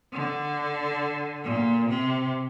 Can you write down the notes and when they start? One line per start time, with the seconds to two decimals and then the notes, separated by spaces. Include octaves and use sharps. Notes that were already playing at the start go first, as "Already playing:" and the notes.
0.13 D3
1.44 A#2
1.88 C3